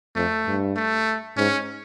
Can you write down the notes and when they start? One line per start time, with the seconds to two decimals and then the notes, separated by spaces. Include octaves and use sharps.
0.15 F2 A3
0.46 G2
0.76 A3
1.37 G#2 C#4